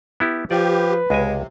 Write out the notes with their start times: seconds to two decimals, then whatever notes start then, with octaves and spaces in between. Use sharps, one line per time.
0.20 B3 E4 G4
0.51 F3 G4 B4 D5
1.10 C#2 C3 G#3 G#5